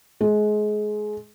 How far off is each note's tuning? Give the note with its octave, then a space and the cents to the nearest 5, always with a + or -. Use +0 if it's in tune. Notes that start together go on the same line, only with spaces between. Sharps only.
G#3 +25